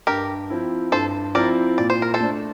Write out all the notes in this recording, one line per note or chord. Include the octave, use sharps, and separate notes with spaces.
G2 G4 A#4
F3 C4 E4
G2 A4 C5
F3 C4 E4 A#4 D5
A#2 D5
C5
A#4
A4 C5
A3 D4